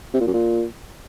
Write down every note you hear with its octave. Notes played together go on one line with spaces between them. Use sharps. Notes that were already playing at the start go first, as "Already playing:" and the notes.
C3
A#2
F#2
A#2